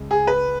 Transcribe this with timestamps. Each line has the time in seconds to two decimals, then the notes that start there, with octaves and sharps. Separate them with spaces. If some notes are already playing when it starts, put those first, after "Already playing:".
Already playing: C#2 C#3 G#3
0.11 G#4
0.27 B4